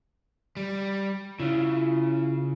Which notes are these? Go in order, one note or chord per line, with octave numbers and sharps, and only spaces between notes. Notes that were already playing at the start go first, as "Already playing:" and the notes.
G3
C#3 E4 F4